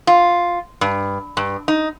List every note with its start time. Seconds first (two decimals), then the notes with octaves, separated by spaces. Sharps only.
0.07 F4
0.81 G2
1.37 G2
1.68 D#4